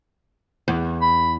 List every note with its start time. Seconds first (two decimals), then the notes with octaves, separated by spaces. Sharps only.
0.68 E2
1.02 B5